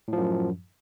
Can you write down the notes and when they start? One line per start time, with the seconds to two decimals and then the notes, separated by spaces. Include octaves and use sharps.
0.08 A2
0.13 F3
0.18 F#2